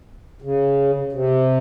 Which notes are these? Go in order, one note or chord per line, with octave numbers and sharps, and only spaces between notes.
C#3
C3